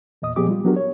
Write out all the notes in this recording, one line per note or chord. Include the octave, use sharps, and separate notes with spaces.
E2 A#2 D#5 D#6
A#2 F3 B3 G4 G#4 D6
G3 F4
F#3 B3 D4 F#4 G4 A#4
C#5